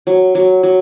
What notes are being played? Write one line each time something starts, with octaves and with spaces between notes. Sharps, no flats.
F#3
F#3
F#3